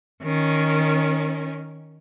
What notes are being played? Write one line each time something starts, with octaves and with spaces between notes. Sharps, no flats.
D#3 C#4